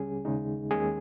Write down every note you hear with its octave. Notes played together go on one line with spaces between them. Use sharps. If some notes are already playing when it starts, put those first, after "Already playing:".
Already playing: C#2 C#3 G3 C#4 G#4
D#2 C#3 G#3 D#4
D#2 D#3 G#3 C#4 G#4